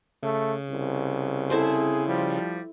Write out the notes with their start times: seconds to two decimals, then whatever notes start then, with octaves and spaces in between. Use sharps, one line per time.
0.23 C#3 A3
0.70 C2
1.50 C4 E4 G#4 A4 C5
2.07 F3 G3